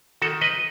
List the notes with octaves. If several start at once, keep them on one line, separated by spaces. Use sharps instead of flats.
D#3 F#4 A4
B4 D#5